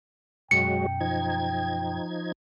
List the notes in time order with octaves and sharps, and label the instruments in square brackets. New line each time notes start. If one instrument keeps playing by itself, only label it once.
[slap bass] F#2 B2 [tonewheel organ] F#3 G#3 F#4 [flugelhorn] G5 [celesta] C#7
[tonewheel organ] F3 D#4 G#6